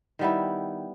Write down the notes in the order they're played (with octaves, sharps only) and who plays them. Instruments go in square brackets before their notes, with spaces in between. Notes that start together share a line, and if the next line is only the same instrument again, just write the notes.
[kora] D#3 G3 B3 E4